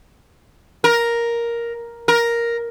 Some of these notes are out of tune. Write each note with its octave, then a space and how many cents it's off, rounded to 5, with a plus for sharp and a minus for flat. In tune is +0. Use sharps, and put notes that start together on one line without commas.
A#4 +5
A#4 +5